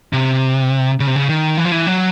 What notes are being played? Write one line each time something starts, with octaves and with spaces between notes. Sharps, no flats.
C3
C#3
C3
C#3
D#3
E3
F3
E3
F#3